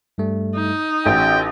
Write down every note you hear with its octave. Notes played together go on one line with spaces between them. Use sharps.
G2 G3 A3
D#4
A1 C#4 F#4 G#4 G5